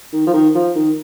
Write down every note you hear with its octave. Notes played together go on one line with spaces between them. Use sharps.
D#3
F3
D#3
F3
D#3